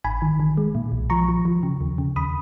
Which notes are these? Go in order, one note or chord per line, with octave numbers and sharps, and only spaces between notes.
G#1 G#5 B5
D#3
D#3
G#3
A#2
B1
F3 A#5 C#6
F3
F3
C#3
D#2
C#3
D#2 B5 D#6